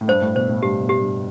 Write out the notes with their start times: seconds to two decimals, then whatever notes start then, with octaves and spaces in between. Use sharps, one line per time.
0.01 A2
0.08 G2 C5
0.21 A2
0.35 B2 C5
0.49 A2
0.62 G2 G4
0.81 B2
0.89 G4
0.99 G2